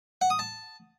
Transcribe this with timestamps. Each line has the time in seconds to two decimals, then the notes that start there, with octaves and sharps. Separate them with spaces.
0.21 F#5
0.30 D#6
0.39 A5